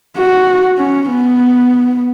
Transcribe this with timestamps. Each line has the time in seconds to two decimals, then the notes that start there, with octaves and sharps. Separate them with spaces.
0.17 F#4
0.78 C#4
1.10 B3